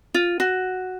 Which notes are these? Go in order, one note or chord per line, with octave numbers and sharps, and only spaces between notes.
F4
F#4